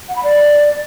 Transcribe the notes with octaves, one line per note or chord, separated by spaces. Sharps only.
F#5
B5
D5